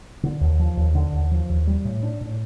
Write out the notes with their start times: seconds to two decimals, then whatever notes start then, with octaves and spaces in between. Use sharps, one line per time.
0.23 D3
0.41 D#2
0.59 F3
0.77 D#2
0.95 D3
1.13 D#2
1.31 F3
1.49 D#2
1.67 G3
1.85 A2
2.03 D4
2.21 A2